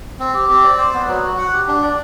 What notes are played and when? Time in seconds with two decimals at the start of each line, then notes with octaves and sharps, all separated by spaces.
0.19 C4
0.34 G4
0.49 C4
0.64 D5
0.78 C5
0.94 B3
1.08 F#3
1.23 F#4
1.38 F#5
1.53 G4
1.68 D4
1.82 D5